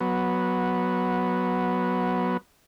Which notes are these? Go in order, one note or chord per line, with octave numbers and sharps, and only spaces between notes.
F#3 B3